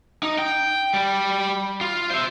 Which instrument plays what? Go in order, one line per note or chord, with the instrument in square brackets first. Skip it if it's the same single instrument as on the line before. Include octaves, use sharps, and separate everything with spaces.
[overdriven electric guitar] D#4
G5
G3
F4
C5 E5